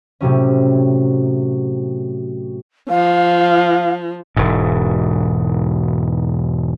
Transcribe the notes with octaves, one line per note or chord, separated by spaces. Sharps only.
A2 C3 F#3 C#4
F3 F5
E1 G#2